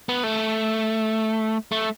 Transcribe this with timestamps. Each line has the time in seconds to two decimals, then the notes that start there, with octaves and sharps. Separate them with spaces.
0.09 B3
0.23 A3
1.72 A3